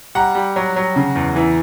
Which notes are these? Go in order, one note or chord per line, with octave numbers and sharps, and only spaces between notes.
G3 F#5 A#5
G3
F#3
F#3
C#3
E2
E3